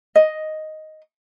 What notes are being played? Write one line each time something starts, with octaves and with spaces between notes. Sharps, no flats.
D#5